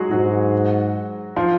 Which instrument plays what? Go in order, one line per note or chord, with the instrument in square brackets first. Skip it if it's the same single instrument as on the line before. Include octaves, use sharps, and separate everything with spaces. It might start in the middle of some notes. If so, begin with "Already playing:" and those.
Already playing: [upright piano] F#3 G#3 F#4 G#4
[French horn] G#2 [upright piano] F#3 F#4
[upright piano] F3 F4